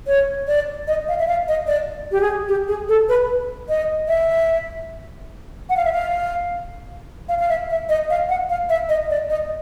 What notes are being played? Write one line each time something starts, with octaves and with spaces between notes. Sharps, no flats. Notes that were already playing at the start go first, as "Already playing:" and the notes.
C#5
D5
D#5
F5
E5
F5
D#5
D5
G4
G#4
G4
G#4
A4
B4
D#5
E5
F#5
F5
E5
F5
F5
F5
E5
E5
D#5
F5
F#5
F5
E5
D#5
D5
D#5